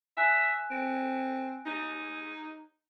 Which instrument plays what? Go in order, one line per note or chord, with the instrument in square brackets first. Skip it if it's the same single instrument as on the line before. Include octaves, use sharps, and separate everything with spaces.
[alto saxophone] E5 [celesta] G#5 F#6
[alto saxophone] C4
D#4